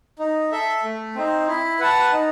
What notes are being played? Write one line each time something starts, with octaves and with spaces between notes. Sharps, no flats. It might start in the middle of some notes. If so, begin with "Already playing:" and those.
D#4
A4 E5
A3
C4 D#4
E4
B4 F#5 A5
D#4